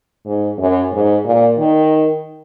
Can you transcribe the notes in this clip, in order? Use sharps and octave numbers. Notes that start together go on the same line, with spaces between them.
G#2
F#2
G#2
A#2
D#3